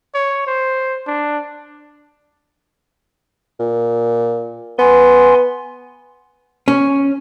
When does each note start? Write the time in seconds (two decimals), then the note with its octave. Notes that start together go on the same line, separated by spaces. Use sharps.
0.14 C#5
0.47 C5
1.07 D4
3.60 A#2
4.79 B3 G#5 C6
6.68 C#4